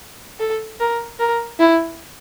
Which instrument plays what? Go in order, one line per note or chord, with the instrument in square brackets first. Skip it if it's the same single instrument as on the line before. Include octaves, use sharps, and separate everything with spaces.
[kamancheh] A4
A#4
A#4
E4